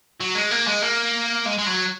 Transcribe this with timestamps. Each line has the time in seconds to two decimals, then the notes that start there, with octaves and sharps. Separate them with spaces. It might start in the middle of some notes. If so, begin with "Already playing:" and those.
0.20 F#3
0.35 G#3
0.51 A#3
0.68 G#3
0.84 A#3
1.46 G#3
1.59 G#3
1.67 F#3